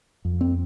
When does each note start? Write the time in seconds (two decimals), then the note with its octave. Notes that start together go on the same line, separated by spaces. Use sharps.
0.25 F2
0.41 C4